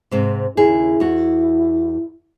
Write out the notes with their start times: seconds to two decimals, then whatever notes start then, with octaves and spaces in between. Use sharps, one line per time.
0.11 G#2 C3 C4
0.57 D#2 C#3 E4 G#4
1.00 E2 F#4